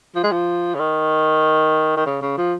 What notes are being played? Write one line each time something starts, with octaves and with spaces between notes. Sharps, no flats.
F3
G#3
F3
C#3
D#3
D#3
C#3
C#3
F3